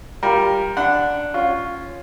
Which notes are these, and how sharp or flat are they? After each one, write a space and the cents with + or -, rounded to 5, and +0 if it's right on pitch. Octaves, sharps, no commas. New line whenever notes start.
G3 +5 F4 -5 A#4 +10
D4 +0 F#5 -10 B5 +45
C#4 +0 F4 +0